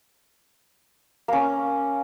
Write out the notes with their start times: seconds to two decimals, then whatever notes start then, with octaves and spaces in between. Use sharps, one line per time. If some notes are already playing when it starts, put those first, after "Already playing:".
1.28 A#3 C#4